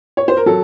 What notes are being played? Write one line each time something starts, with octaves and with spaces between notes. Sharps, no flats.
C#5
C5
A#4
F#3 A4